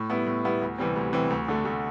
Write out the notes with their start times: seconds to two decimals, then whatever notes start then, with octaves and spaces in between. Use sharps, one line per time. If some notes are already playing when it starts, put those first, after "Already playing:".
Already playing: A2
0.10 G3 B3 E4
0.26 A2
0.44 G3 B3 E4
0.61 D2
0.78 C3 E3 G3 C4
0.96 D2
1.13 C3 E3 G3 C4
1.30 D2
1.48 D3 A3
1.65 D2